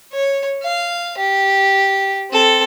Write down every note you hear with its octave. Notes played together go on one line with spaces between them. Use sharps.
C#5
F5
G4
C4 A4